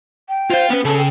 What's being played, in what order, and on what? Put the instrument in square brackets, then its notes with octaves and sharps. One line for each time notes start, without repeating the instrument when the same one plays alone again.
[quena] G5
[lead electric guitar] F4 F5 [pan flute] C5
[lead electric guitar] B3 B4 [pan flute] C#4
[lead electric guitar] C#3 [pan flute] A4 [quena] A5
[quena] G5